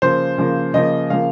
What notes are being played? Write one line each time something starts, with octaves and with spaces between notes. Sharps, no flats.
C#3 F3 A#3 C5
C#3 F3 A#3
C#3 F3 A#3 D#5
C#3 F3 A#3 F5